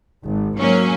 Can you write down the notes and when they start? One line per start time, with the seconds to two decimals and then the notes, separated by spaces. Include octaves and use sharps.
0.23 G#1
0.59 G#2 F#3 A#3 C#4